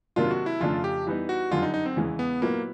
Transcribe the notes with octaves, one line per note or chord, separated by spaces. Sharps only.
C3 D#3 F#3 A#3 D4 F4
F#4
E4
F2 C#3 F3 A3 D4 F4
G4
E3 G3 B3 D#4
F#4
F#2 D3 G3 F4
D#4
D#4
C4
E2 C#3 E3 G#3
B3
A#2 F#3 A#3 B3 E4